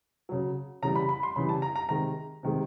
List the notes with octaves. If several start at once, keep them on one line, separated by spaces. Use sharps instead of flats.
C#3 F#3
C#3 E3 G3 A#5
B5
B5
C6
C#3 E3 G3 B5
A5
A#5
A#5
C3 D#3 G#3 A#5
C3 D#3 G#3